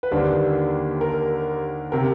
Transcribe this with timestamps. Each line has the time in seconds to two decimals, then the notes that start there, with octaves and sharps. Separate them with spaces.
0.03 B4
0.11 D#2 D3 G3 A#3 D4 C5
1.01 A#4
1.92 C3 A#4